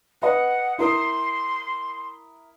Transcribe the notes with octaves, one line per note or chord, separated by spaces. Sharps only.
B4 D#5 F#5
E4 A#4 C6 D#6